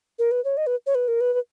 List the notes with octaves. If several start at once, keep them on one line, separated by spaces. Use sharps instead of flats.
A#4
B4
C#5
D#5
B4
C#5
B4
A#4
B4
B4